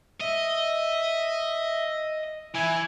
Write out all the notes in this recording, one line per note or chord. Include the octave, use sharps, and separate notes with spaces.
D#5 E5
E3 E4 G#5